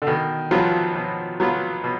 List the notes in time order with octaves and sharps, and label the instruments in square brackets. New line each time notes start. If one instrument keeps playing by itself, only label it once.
[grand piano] D3
[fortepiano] B2 [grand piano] D#3
[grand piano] F3 [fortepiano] F#3 B3 F4
[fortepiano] B2
F#3 B3 F4
B2